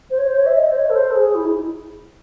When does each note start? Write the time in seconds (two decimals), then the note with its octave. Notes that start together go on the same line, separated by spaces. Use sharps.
0.10 C5
0.18 C#5
0.27 C5
0.37 C#5
0.46 E5
0.56 D#5
0.71 C5
0.76 C#5
0.89 A4
0.95 C5
1.10 A4
1.15 G#4
1.35 E4
1.45 D#4
1.54 E4